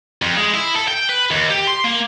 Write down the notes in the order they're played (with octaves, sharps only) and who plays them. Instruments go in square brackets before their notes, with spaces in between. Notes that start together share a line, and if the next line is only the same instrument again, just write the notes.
[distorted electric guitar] F2
G#3
E4
A4
G5
B4
D#2
G4
C6
A#3